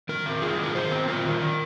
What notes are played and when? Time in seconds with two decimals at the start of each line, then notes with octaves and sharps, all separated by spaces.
0.09 D#3 A#4
0.26 C4
0.42 F4 G#4
0.58 D#3 A#4
0.75 D#3 C5
0.92 C4
1.08 F4 A#4
1.25 D#3
1.41 D#3